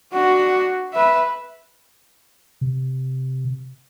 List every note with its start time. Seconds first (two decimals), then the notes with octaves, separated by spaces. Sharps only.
0.13 D4 F#4
0.93 B4 E5
2.61 C3